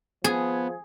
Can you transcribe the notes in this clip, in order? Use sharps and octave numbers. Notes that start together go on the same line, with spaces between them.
F3 B3 G#4